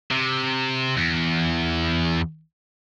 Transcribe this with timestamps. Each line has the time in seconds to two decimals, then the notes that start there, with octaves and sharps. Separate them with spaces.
0.11 C3
0.97 E2